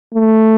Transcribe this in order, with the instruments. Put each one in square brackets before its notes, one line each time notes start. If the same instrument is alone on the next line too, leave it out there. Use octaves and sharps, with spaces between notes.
[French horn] A3